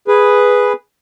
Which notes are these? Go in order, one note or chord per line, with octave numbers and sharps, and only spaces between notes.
G#4 B4